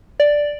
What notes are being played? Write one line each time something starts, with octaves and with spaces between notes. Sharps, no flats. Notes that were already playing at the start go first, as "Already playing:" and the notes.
D5